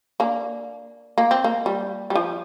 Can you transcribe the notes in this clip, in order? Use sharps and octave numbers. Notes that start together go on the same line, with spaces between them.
A#3 D4
A#3
C4
A#3
G3
G3
F3